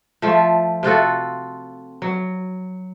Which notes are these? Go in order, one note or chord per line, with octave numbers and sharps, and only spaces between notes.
F3 A3 F4
C3 F4 F#4 A4
F#3